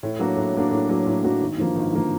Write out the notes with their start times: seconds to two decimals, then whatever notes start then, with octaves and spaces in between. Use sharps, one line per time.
0.03 A2
0.19 F#3 A#3 D4 F#4
0.36 A2
0.54 F#3 A#3 D4 F#4
0.71 A2
0.89 F#3 A#3 D4 F#4
1.06 A2
1.23 F#3 A#3 D4 F#4
1.41 G#1
1.58 G2 D3 F3 A#3
1.76 G#1
1.92 G2 D3 F3 A#3